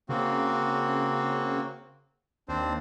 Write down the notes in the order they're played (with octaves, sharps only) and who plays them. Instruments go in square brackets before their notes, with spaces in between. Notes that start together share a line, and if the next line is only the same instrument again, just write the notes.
[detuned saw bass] C#3 [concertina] A#3 C4 F#4
[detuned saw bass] D#2 [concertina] C4 D4 C5